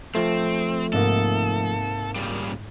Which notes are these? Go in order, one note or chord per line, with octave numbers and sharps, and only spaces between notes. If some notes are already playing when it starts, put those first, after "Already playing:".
F3 A3 C4
G#2 C3 A#3 A4 D#6
A#2 C#3 G3